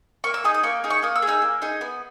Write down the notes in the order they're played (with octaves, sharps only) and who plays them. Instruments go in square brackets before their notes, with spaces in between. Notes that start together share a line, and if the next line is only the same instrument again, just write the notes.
[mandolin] A#3 C#6
E6
D#4 G#4 D#6
D#6
A#3 C#6
D#4 G#4
C#6
A#3 D#6
E6
G#4
D#4 E6
A#3
D#4 G#4
B3